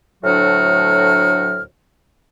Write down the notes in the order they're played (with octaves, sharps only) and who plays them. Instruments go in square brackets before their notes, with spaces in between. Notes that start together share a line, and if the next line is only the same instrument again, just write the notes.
[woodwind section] D2 A2 F#3 D4 F#4 F6